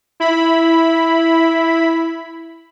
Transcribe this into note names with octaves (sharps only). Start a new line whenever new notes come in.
E4 B5